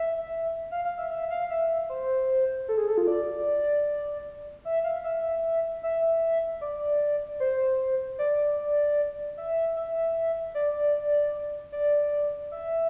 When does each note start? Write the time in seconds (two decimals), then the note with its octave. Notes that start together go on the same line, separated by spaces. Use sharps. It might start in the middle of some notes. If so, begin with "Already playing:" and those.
Already playing: E5
0.71 F5
0.85 F5
0.98 E5
1.10 E5
1.31 F5
1.50 E5
1.89 C5
2.68 A4
2.77 G#4
2.88 A4
2.98 F4
3.07 D5
4.65 E5
4.84 F5
5.04 E5
5.83 E5
6.61 D5
7.40 C5
8.19 D5
9.37 E5
9.77 E5
10.55 D5
11.72 D5
12.51 E5